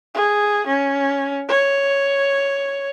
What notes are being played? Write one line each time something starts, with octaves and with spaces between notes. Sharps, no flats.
G#4
C#4
C#5